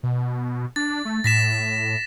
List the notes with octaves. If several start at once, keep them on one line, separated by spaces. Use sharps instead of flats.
B2
D4 A6
A3
A2 A#6 B6 E7